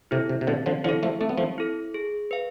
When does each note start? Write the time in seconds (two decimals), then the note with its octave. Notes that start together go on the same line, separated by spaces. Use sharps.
0.11 C3 E4 A4
0.29 C3
0.41 C3
0.47 B2 D3 C4
0.66 D3 F3
0.84 D3 F3 E4
0.89 A4
1.03 F3 A3
1.21 A3 C4
1.29 B3
1.38 F3 A3
1.58 E4 A4
1.94 G#4
2.31 B4 F5